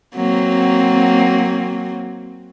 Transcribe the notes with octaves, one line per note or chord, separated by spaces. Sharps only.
F#3 A#3 C4